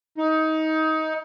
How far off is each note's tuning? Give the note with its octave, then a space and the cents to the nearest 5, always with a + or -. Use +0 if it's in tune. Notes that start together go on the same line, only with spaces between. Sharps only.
D#4 +20